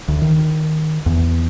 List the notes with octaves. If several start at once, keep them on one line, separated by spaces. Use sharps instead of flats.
D2
D#3
E2